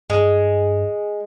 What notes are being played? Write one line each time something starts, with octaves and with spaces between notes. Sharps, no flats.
G2 G#3